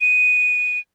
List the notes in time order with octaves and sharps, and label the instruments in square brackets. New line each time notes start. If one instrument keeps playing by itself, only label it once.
[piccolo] D#7